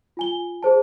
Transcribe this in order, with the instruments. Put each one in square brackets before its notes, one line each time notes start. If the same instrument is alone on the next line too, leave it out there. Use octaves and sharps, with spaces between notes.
[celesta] F4 G#5 G7
G#4 C5 A5